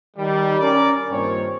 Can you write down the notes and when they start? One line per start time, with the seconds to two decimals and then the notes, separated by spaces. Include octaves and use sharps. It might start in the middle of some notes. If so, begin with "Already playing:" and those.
0.17 D#3 G3
0.60 C#4 A#4 D5
1.10 G2 A#2 D#3 C4 C#5